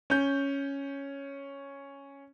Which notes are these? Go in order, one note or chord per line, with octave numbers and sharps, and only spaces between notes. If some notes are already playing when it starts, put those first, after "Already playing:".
C#4 G6